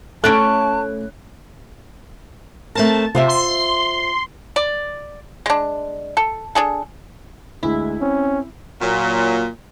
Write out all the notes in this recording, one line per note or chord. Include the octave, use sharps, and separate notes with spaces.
A3 C#4 E4 D5 A5 F#6 D7
A3 C4 A#4 A5
C3 F4 C5 E5
C6
D5
G#3 D4
A4
D4 G#4 A4
D2 G#3 E4
C4 C#4
A#2 F#3